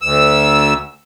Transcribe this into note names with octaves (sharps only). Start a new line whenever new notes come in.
D2 E6